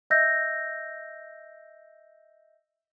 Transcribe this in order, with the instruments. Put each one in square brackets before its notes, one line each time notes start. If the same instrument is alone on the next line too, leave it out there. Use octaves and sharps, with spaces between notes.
[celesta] D#5 E5 E6 G6 A#6